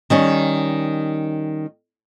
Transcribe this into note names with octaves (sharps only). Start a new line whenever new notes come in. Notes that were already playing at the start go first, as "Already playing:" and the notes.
D#3 G3 C#4